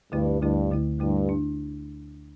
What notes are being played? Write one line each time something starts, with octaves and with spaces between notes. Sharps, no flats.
D2 G2 D3 A3 E4
D2 G2 D3 A3 E4
D2 D3 A3 E4
D2 G2 D3 A3 E4
D4